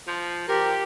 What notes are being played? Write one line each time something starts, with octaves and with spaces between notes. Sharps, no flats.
F3
F3 G4 A#4